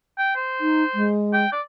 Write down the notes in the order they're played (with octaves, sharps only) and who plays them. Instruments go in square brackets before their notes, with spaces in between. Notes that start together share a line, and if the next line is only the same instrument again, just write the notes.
[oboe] G5
C5
[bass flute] D#4
G#3
[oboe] G5
D5